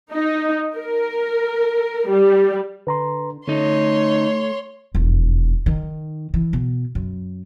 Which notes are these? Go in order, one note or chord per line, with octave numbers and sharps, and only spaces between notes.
D#4
A#4
G3
D3 B4 A#5 C6
D3 A3 C#4 D#4 C#5 C6
E1 F2
D#3
E3
B2
F#2